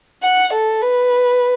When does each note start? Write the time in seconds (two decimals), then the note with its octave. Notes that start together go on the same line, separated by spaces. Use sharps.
0.23 F#5
0.53 A4
0.81 B4